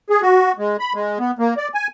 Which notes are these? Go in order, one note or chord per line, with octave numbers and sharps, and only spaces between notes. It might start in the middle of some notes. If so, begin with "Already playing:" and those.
G#4
F#4
G#3
B5
G#3
B3
A#3
D5
G#5